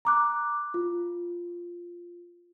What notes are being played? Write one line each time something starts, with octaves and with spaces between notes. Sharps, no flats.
A#5 D6 F#6
F4